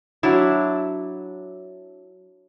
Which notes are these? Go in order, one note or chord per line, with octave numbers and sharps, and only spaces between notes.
F#3 D4 E4